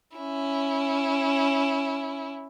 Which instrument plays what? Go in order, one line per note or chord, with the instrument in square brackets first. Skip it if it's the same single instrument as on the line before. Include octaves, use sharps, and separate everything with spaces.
[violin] C#4 E4